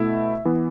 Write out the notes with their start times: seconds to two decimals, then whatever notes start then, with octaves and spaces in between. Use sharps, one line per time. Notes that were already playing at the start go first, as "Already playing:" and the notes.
Already playing: B2 A3 E4 E5
0.45 E3 B3